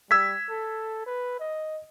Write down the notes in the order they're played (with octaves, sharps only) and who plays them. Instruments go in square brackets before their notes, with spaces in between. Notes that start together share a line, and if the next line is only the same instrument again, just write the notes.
[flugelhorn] G3 [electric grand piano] E6 G#6 B6
[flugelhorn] A4
B4
D#5